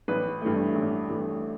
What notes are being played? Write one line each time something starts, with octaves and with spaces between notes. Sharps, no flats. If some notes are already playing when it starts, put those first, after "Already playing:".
A1 B4
G2 E3 A3
A1
G2 E3 A3